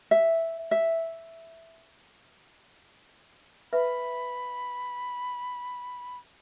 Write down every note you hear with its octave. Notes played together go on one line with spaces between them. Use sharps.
E5
E5
B4 E5 B5